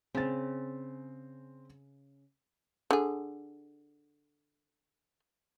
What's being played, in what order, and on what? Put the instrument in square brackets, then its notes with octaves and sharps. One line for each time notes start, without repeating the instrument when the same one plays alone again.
[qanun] C#3 [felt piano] C4 A6
[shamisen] D3 G#4